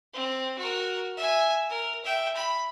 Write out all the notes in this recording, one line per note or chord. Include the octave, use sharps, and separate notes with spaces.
C4
F#4 A#4
E5 G#5
A#4
E5 G5
B5